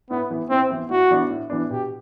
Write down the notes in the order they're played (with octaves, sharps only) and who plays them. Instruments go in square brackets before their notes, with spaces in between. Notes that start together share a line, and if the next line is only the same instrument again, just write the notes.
[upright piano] A2 [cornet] B3
[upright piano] E3 B3 E4
[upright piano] A2 [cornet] C4
[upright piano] E3 B3 E4
[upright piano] A2 [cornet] F#4
[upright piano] E3 B3 D4
A2
E3 B3 D4
[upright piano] B2 [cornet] G4